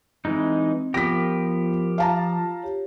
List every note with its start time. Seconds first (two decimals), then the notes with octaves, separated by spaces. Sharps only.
0.25 E3 G#3 C4 D#4
0.94 F3 B3 G4 A#4 A#6 B6
1.98 F4 F5 A5 A#5
2.63 G4 C#5